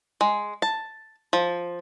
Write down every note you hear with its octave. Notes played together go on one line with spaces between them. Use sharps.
G#3
A5
F3